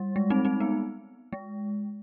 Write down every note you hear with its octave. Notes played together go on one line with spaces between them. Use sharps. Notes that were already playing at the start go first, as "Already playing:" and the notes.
Already playing: G3
G#3
C4 D#4
C4 D#4
B3
G#3